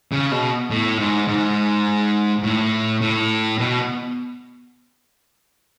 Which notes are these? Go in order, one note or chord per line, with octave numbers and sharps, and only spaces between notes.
C#3
B2
A2
G#2
G#2
A2
A2
B2